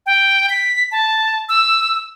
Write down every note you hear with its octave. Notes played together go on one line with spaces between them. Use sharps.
G5
B6
A5
E6